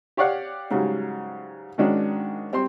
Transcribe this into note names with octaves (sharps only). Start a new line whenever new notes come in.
G4 C#5 D5 F5 F#5
G#2 C#3 F#3 G3
G#2 D#3 G#3 C#4 D4 F#4
G3 C4 C5 C6